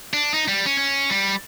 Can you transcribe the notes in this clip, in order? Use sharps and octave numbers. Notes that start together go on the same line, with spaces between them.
D4
D#4
G3
C#4
C#4
G3